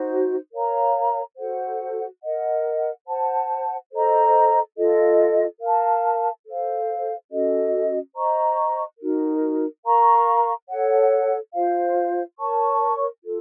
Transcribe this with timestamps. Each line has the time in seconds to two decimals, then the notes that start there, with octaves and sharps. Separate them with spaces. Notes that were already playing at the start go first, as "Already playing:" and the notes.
Already playing: D#4 F#4 C5
0.53 A#4 C#5 F5 A#5
1.38 F#4 A4 C5 F#5
2.23 A#4 D#5 F#5
3.07 C5 F#5 A5
3.93 A4 C5 D#5 A#5
4.77 F4 A4 D#5
5.61 A#4 F5 A5
6.46 A4 C5 F5
7.31 C#4 F#4 A4 D#5
8.15 C5 D#5 A#5 C#6
9.00 D#4 F#4 A#4
9.85 A#4 F5 A#5 C#6
10.70 A4 C#5 F#5
11.55 F4 C5 F5
12.39 A#4 C#5 A5 C#6
13.24 F4 A4